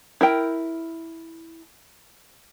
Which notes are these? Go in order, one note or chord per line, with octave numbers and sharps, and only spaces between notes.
E4 A#4 G5